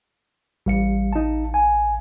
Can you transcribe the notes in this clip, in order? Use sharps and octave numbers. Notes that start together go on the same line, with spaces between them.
A1 G3 F5 C#7
D#4 A5
G#5